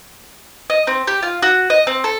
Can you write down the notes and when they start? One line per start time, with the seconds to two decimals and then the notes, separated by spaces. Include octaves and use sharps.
0.70 D#5
0.87 C4
1.07 G4
1.23 F4
1.42 F#4
1.70 D#5
1.87 C4
2.04 A4